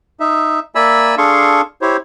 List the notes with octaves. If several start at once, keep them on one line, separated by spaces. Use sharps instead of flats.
D#4 E5
A#3 D5 E5 G#5 B5 E6
D4 G#4 A4 F5 C6 C#6
E4 G4 C5 C#5